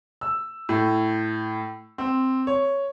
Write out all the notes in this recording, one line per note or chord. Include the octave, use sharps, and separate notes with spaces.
E6
A2
C4
C#5